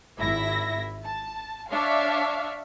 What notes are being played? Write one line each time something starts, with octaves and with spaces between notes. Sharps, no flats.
G#1 E4 E5 A#6
A5
D4 C#5 E5 F5